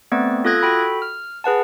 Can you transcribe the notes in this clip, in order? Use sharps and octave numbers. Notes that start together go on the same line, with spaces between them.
A3 B3 C4 D5
F4 A4 D#6 F#6 G#6 A#6
F#4 A4 G5 B5
F6
G#4 B4 F#5 A5